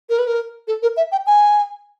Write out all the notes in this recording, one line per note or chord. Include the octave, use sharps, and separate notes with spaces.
A#4
B4
A#4
A4
A#4
E5
G5
G#5